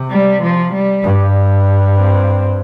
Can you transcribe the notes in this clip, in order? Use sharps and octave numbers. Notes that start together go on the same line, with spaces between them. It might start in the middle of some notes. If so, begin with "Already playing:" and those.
Already playing: C3
G3
F3
G3
G2
C4